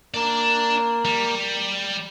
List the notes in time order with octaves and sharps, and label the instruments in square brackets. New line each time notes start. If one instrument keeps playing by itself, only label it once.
[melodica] A#3 [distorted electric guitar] D5 A5
[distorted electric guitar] G3